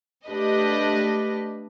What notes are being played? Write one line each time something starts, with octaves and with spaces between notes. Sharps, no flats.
A3 D4 G4 B4 D#5